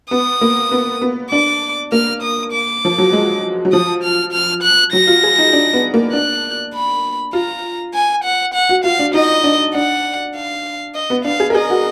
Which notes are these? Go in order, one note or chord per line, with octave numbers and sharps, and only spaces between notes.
B3 D#6
A#3
B3
B3
D4 D6
A#3 F6
D#6
D6
F3
F#3
G#3
F#3
F3 D#6
F6
F6
F#6
F#3 A#6
F4
G#4
D#4
D4
B3
A#3
D4 F#6
B5
F4 A#5
G#5
F#5
F#5
F#4
F4 F5
D4
D#4 D#5
D4
D4 F#5
F5
D#5
B3
D4 F5
G#4
A#4
G#4 D#5
F#4